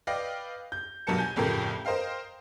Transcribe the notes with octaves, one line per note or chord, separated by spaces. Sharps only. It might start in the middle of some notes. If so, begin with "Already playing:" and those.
B4 D5 D#5 F5 G5 A#6
G6
B1 G2 F#3 A#4 A5 C#7
G#5 G6
G1 F2 A2 C#3 G4 A#4
A#4 C5 D#5 F5 G5